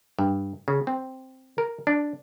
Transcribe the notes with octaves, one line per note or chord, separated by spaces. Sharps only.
G2
C#3
C4
A#4
D4